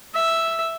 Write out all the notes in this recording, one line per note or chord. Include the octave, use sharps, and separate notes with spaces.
E5